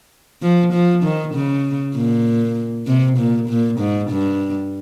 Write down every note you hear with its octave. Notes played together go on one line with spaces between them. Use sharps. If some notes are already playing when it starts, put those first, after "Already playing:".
F3
F3
D#3
C#3
A#2
C3
A#2
A#2
G#2
G2